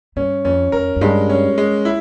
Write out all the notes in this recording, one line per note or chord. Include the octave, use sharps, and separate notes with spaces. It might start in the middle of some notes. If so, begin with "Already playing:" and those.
G2 C#4
F2 C#4
F2 A#4
F2
G2 G#3
C#4
G#3
E4